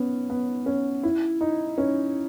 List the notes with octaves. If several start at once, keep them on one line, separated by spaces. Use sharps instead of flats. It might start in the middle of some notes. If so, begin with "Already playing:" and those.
Already playing: B3 C#4
B3
C#4
E4
D#4
C#4